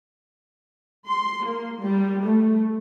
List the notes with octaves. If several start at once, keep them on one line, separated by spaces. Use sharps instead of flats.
C6
A#3
G3
A3